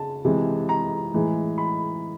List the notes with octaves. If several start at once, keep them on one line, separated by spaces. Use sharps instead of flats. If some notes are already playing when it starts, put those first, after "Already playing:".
Already playing: C#3 A5
C3 E3 G#3
A#5
A2 E3 G#3
B5